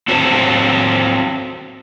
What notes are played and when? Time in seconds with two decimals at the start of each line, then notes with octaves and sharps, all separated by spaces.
0.08 C4 F#4 A4 C5 C#5